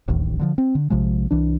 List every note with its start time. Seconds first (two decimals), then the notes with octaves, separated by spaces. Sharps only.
0.08 D1 A1 D#2
0.39 D3 E3 F3
0.58 C4
0.75 D3
0.90 A#1 C3 F3 G#3
1.31 C2 E3 D4